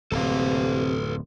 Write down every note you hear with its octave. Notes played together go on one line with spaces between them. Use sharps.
D1 F2 C3 A4 B4 F5